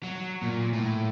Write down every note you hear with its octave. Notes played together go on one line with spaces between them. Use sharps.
F#3
A#2
A2